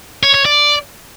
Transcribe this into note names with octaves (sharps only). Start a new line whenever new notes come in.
C#5
C#5
D5